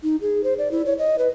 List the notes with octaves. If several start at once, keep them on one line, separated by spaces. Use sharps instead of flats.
D#4
G#4
C5
D5
E4
C#5
D#5
B4